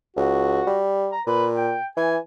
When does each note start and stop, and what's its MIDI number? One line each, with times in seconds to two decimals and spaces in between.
0.17 0.62 37
0.17 0.80 66
0.67 1.12 55
1.12 1.21 82
1.27 1.75 46
1.27 1.45 71
1.55 1.85 79
1.97 2.18 52
1.97 2.15 80